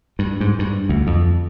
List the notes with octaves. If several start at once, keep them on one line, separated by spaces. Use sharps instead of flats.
G2
G#2
G2
D2
F2